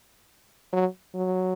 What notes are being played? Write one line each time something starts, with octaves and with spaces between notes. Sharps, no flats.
F#3
F#3